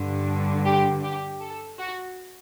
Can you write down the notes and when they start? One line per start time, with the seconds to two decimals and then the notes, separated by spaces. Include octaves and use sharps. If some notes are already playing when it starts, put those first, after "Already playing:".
Already playing: G2 D3
0.65 G4
1.03 G4
1.41 A4
1.79 F#4